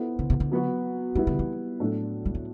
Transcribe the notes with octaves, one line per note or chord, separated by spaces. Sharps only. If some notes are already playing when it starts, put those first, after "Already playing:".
Already playing: B3 E4 A4 C5
D3
C3
D3
F#3 B3 F#4
E3 G3 B3 E4
D3
E3
A2 F#3 A3 D4 A4
G3
F#3